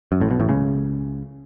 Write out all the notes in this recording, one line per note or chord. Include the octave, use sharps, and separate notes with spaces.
F#2
A1 A2
B1 B2
A1 A2
C#2 C#3